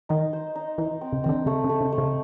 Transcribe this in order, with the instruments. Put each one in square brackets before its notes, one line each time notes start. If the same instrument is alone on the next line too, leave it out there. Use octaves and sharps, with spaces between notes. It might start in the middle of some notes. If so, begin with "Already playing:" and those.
[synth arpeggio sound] D#3 [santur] D#4
[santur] C5
D#4
[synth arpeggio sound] E3 [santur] D#4
[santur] C4
[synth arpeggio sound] C#3
[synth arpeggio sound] D#3 [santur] C4
[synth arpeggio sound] D3
[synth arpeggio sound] C#3 [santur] A3
[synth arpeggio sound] C#3
[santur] A3
[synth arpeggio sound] C#3
[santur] A3
[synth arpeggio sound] C#3